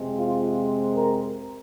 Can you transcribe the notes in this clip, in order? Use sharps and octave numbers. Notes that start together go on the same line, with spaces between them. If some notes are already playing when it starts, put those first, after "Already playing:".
Already playing: F2 C3 G#3 C4
F4
A#4